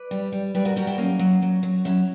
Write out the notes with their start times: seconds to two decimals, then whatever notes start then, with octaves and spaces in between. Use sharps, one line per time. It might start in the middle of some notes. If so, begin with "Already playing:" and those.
Already playing: B4 D5
0.11 G3
0.32 G3
0.55 G3 B4 D5
0.65 F#4 A#4
0.76 G3 F#4 A#4
0.87 E4 G4
0.98 F#3 A#3 C#4
1.19 F#3
1.42 F#3
1.63 F#3
1.85 F#3 C#4 E4